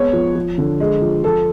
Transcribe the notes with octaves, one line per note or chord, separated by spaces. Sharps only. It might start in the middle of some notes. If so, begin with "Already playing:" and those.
Already playing: G#3 B3 C#5
F3
F3
D3
G#3
F3
F3 A4